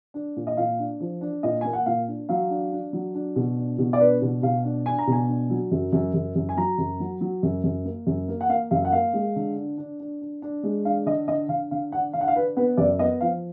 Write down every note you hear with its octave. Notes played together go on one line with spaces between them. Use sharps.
D4
A#2
D#5
A#2 F5
D4
F3
D4
A#2 D#5
A#3 G#5
F#5
A#2 F5
D4
F#3 F5
D4
D4
F#3
D4
B2
D4
B2
D5
D4 B4
B2
B2 F5
D4
D4 G#5
A#5
B2 G#5
D4
F#3
F#2
F#2
F#2
F#2
G#5
F#3 A#5
F#2
F#3
F#3
F#2
F#2
A#3
F#2
A#3
F#5
A#3 F5
F#2 F5
F#5
A#3 F5
G#3
D3
D4
D4
D4
D4
D4
G#3
D4 F5
D3 D#5
D3 D#5
D3 F5
D3 F5
D4 F#5
D3 F5
F#5
F5
D4 B4
B3 B4
F#2 D5
B3 D#5
F3 F5